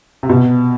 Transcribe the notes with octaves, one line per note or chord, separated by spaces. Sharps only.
C3
B2